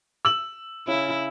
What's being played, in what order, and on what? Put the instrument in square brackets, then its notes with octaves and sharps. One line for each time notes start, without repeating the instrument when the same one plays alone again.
[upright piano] E6 F#7
[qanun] C#3 G#5 [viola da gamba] E4